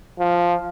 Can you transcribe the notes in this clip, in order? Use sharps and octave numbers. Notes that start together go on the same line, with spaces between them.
F3